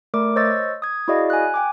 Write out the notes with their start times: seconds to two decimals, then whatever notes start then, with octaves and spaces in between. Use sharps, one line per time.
0.14 A3 A#4 D5 D6
0.36 C5 C#5 D#5 C#6 E6 A6
0.82 D#6 G#6
1.08 E4 F#4 G#4 D5 D#5 F5
1.30 G#5 F#6
1.54 G5 G#5 D6